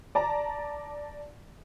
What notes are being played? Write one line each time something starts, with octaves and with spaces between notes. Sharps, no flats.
D5 A5 A#5